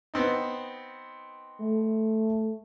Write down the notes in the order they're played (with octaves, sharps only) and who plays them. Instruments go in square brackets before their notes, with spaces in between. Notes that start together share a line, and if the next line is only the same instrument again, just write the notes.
[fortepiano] B3 C4 D#4
[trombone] A3